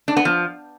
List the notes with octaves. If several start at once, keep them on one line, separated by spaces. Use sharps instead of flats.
D4
B3
F3